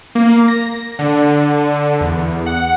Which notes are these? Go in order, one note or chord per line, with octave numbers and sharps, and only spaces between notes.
A#3
A#6
D3
E2
F#5